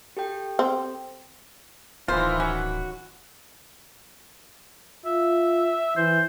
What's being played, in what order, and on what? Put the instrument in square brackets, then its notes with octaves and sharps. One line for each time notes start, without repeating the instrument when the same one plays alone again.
[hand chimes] G4 A4 G5
[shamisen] C4
[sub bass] D1 [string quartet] D#3 E3 E4 [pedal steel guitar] F4 [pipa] C5
[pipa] C#4 [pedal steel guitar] F#4
[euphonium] F4 [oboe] E5
[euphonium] E3 [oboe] C5